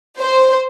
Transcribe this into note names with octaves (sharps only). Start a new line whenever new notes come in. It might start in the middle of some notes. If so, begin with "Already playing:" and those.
C5